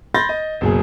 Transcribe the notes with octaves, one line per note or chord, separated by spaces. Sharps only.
B5 C6 G6 A6 A#6
D#5
F#1 B2 G#4